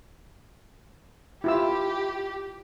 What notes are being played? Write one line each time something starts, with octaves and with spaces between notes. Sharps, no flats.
E4 F4 G4 E6